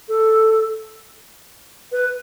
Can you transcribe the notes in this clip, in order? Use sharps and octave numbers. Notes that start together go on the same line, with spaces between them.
A4
B4